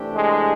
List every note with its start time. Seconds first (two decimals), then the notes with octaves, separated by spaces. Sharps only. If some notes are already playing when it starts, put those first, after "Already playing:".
Already playing: C3 E3 A3 D4 G4
0.16 G#3